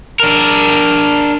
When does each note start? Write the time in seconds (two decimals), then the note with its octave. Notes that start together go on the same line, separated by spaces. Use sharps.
0.20 D4 A#4